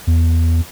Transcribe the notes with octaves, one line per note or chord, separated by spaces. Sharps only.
E2